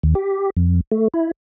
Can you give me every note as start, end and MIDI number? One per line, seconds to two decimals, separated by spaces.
0.03 0.14 39
0.15 0.50 67
0.57 0.81 41
0.92 1.08 57
1.14 1.31 64